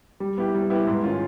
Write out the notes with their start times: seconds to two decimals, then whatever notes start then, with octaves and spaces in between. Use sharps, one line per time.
0.20 G3
0.38 B3 E4 G4
0.55 G3
0.70 B3 E4 G4
0.87 G#2
1.04 D#3 G#3 C#4 F4